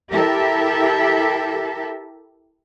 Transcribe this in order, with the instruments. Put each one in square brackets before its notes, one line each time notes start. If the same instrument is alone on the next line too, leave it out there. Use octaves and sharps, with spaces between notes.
[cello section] E4 G4 A4 A#4 E5